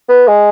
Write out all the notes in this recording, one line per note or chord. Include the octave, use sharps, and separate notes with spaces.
B3
G#3